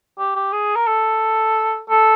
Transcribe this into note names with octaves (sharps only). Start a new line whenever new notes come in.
G4
G4
G#4
A#4
A4
A4